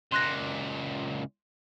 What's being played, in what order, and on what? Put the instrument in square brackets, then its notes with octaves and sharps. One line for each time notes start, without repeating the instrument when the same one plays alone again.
[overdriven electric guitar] C#2 A#2 [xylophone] C6 F#6 A#6